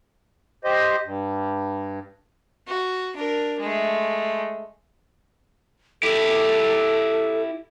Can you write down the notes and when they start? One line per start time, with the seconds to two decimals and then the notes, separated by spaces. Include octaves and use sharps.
0.64 G4 C5 D#5
1.05 G2
2.67 F#4
3.16 D4 A#4
3.60 G#3 A3
6.03 E4 G4 A4